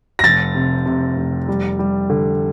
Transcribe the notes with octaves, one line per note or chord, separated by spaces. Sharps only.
A#6
F1 A6
C3
C3
F1
G3
G3
D3